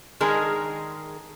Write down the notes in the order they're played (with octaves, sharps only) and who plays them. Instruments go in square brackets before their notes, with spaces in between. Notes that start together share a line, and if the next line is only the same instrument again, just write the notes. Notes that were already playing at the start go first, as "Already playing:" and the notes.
[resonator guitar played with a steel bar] D#3 G#3 D4 G#4 A#4